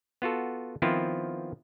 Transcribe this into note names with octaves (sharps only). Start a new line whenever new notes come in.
B3 F4 F#4 A4
D#3 F3 B3 C4 E4 F4